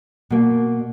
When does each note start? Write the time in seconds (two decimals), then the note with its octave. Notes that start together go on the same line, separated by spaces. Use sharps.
0.30 B2 A#3